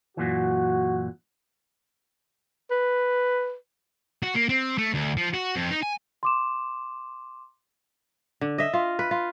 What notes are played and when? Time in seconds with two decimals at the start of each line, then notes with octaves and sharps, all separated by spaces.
0.17 F#2 A#2 E3 F#4
2.71 B4
4.23 F#4
4.35 A#3
4.49 C4
4.78 A3
4.94 D2
5.17 F3
5.34 F#4
5.56 F2
5.71 D#4
5.83 G#5
6.23 C6 D6 E7
8.41 D3
8.58 D#5 E5
8.73 F4
8.99 B4
9.11 F4